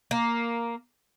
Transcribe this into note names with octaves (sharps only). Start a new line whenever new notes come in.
A#3